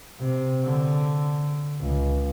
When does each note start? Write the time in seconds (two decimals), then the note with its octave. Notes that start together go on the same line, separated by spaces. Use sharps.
0.20 C3
0.64 D3
1.81 C#2